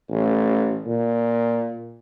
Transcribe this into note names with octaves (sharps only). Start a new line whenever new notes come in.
A1
A#2